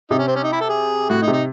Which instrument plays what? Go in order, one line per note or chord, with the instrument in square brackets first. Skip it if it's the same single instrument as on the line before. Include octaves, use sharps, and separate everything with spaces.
[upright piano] C3 [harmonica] D#4
[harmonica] C#4
C4
C#4
D#4
E4
A4
G#4
[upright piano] A2 [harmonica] F#4
[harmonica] D#4
[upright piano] C3
[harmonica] D#4